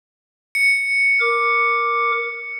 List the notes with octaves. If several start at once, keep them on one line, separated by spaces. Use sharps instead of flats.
C#7
A#4 D6